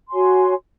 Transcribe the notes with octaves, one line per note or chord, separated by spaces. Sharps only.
F#4 C#5 G#5 C6